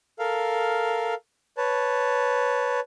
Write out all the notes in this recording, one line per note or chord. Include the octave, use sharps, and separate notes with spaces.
A4 A#4 F5
B4 C#5 A5